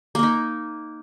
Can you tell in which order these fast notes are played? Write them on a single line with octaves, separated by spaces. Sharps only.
A#3 A#4 D#4